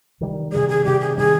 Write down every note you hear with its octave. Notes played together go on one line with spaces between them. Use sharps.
C3 D#3 G3
C3 D#3 G3 G#4
G#4
C3 D#3 G3 G4
G#4
C3 D#3 G3 C4 G#4